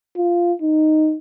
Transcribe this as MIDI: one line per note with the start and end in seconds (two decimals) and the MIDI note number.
0.17 0.53 65
0.62 1.16 63